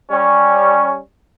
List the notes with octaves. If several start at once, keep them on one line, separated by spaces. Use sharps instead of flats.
G3 C#4